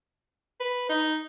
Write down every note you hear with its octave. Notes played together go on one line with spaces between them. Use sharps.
B4
D#4